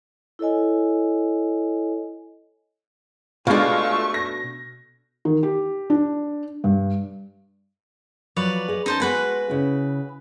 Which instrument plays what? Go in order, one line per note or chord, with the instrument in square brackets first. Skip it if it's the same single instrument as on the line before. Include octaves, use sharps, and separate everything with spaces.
[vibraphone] E4 A4 C#5 D#5 G#5
[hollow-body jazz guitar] B2 D4 [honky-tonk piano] G#3 F4 [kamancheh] A3 C#6
[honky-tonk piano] A#6
[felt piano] D#3
G4
D4
G2
[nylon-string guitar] F3 F#3 [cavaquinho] B4 C#5 D5
[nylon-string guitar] G#4 D#5
[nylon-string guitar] C#4 [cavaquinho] D#4 C5 A5
[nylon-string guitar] G#3 B3 [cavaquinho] F#4 B4 G#5
[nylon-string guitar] C#3 E4